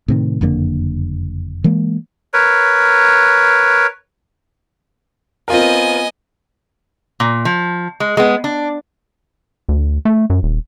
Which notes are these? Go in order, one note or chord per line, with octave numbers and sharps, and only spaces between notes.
A2 C3 D#3
F#1 F2 D3 A#3
E3 G#3 A#3
A#4 B4 C#5
B3 C4 F4 A#4 D#5 G#5
A#2
F3
G#3
G#3 B3
D4
D2
A3
F#2
D#1